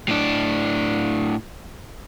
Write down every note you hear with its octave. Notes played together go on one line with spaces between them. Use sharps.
A2 D4